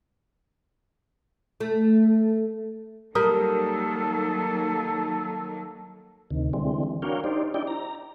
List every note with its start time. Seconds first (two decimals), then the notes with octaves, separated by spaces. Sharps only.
1.60 A3
3.15 D#3 F#3 G3 A#3 A4 A#4 D#6
6.31 D2 C3 D#3
6.53 D3 E3 G3 G#3 C4
7.02 D4 F#4 A#4 C#5 F5 G5
7.24 D#4 G4 C5 D5
7.54 D4 E4 G4 D5 D#5 G5
7.67 A#5